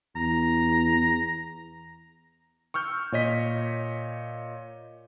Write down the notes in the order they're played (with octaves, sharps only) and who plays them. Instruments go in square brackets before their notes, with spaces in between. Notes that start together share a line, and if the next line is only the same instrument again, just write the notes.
[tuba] E2 [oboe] A#5
[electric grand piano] C#6 E6 F6 G6
A#2 C#5 D#5 B6